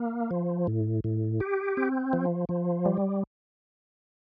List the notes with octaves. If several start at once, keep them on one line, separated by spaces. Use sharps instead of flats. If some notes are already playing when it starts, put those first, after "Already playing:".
Already playing: A#3
F3
A2
A2
G4
C4
F3
F3
G3